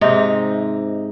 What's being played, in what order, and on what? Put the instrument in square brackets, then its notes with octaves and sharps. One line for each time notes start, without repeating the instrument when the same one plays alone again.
[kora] G#2 C3 D#4